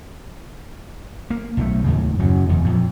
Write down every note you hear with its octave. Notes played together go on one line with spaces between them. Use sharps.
A#3
B1 F3 A3
D#2 A2 C#3
F#2 C#3 F#3
E1 E2
F2 A#2